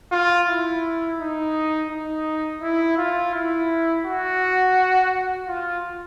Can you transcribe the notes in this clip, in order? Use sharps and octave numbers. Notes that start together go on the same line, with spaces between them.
F4
E4
D#4
D#4
E4
F4
E4
F#4
F4